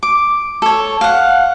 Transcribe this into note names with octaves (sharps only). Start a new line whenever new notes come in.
D6
A4 C#5
F5 F#5